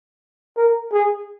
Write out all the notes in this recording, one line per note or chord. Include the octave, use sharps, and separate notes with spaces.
A#4
G#4